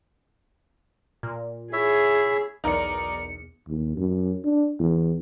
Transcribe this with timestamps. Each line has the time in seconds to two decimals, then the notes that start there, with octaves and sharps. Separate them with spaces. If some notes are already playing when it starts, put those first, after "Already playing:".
1.23 A#2
1.73 E4 G#4 C#5 E5
2.64 B1 E2 D#4 A#4 D5 C#7
3.69 D#2
3.97 F#2
4.45 D4
4.80 E2